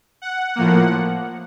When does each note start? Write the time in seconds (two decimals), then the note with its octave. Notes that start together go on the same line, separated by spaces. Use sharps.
0.22 F#5
0.56 A2 F3 A#3